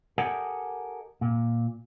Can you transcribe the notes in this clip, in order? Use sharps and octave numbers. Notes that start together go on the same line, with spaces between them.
G4 A4 A#4 D#5 F#5 G#5
A#2